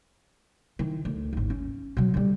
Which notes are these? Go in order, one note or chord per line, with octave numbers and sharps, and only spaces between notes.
D#3 E4
D2
G#1 D#2
C#4
B2 F#3
D3 G3